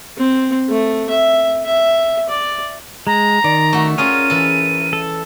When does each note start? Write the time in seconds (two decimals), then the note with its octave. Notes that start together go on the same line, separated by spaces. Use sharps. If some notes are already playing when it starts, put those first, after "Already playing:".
0.17 C4
0.69 A3
1.09 E5
1.66 E5
2.29 D5
3.07 G#3 A#5
3.44 D#3 D5
3.73 A3 F#4
3.98 C#4 F4 G#4 A#4 D#7
4.30 E3 A4
4.93 A4